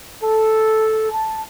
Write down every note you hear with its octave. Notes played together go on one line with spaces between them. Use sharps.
A4
A5